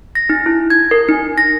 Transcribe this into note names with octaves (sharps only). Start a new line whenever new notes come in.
A#6
D#4
E4
G#6
A#4
D#4
A#6